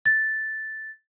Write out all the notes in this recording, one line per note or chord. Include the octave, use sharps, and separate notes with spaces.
A6